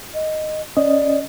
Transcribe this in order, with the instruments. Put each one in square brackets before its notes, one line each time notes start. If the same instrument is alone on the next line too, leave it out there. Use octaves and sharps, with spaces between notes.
[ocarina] D#5
[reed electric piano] C#4 D#5 [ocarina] D5